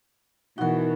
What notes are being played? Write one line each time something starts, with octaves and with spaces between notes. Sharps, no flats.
B2 E3 D#4 F#4 A#4 F#5